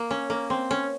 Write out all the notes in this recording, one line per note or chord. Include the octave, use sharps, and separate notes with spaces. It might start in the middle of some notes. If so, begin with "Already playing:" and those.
Already playing: A#3
C#4
A#3
C4
C#4